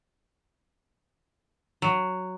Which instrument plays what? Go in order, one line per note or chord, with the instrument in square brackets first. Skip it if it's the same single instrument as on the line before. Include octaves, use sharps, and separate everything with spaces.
[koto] F#3